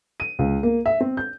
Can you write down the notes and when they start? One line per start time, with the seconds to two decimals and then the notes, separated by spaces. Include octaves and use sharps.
0.20 D#7
0.39 C#2
0.63 A#3
0.86 E5
1.01 C4
1.17 G6